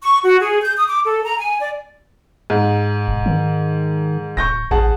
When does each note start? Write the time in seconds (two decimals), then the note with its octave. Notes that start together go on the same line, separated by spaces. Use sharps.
0.03 C#6
0.24 F#4
0.40 G#4
0.63 G6
0.77 D#6
0.89 D6
1.05 A4
1.24 A#5
1.38 G#5
1.59 D5
2.50 G#2
3.08 E1
3.26 D#3
4.37 D1 C#6 G6 A#6
4.71 A1 G#4 F#5 A5